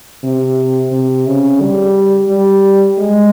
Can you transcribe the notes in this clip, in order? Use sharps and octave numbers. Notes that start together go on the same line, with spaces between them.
C3
C3
C#3
G3
G3
G#3